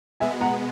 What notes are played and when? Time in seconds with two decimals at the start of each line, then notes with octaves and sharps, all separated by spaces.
0.20 B2 G#3 B3 E5 G#5
0.41 F#5 A#5